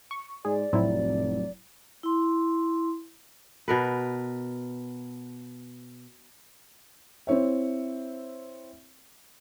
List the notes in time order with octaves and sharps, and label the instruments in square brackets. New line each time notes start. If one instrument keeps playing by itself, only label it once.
[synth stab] C#6
[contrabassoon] G#2 [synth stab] G#4 [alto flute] D5
[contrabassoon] F1 [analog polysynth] A2 F#3 [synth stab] C4 E4
[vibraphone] E4 C6
[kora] B2 A#4 B4
[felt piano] C4 E4 C#5 E5